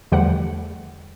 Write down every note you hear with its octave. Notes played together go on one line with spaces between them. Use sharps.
E2 D3 F3 G3 A3 F#5